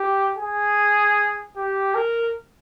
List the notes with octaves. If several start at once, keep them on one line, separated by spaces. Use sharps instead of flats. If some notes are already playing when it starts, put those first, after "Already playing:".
Already playing: G4
G#4
G4
A#4